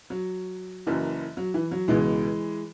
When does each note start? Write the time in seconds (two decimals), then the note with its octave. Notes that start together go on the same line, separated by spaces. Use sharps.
0.10 F#3
0.87 F#1 F#2 E3
1.37 F#3
1.54 E3
1.71 F#3
1.88 C#2 B2 E3 G#3